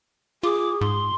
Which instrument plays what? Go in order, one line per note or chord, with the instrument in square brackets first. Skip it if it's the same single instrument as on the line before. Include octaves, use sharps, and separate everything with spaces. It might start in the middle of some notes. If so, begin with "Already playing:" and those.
[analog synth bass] F4 [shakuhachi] G#4 [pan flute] D6
[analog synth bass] G#2 [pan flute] C6